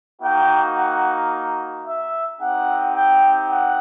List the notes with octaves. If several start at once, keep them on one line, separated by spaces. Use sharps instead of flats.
A#3 D#4 F#4 G5
F#5
E5
C4 D#4 G4 F#5
G5
F#5